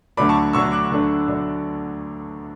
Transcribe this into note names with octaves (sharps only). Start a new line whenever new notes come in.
D2 D3 F#3 A3 D4 B5 D6
A5 C#6
D2 D3 F#3 A3 D4 C#6 E6
D6 F#6
D2 D3 F#3 A3 D4
D3 F#3 A3 D4